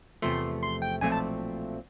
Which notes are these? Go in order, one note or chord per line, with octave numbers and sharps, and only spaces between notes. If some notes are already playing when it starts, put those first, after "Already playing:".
E2 C3 F3 A3 C6
C6
G5
B1 A#2 F3 A3 C4 G#5
A5